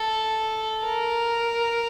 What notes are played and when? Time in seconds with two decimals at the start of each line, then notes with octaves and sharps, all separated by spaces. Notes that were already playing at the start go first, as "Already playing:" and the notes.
Already playing: A4
0.85 A#4